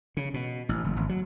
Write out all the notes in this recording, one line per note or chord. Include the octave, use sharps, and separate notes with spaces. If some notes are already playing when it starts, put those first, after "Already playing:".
C#3
B2
A1
F#1
G#1
F#3